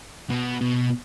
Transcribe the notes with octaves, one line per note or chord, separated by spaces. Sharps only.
B2
B2